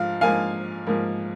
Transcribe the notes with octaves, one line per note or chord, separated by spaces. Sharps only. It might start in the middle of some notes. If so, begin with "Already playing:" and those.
Already playing: G#2 F3 F5
G#2 F3 A#3 F5 G#5
G#2 F3 A#3